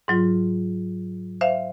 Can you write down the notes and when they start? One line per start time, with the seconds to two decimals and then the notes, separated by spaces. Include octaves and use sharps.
0.08 G#2 F#3 F4
1.41 C5 E5 F5